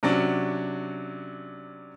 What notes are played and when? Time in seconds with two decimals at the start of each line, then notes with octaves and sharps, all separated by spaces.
0.03 C3 F#3 C#4 D4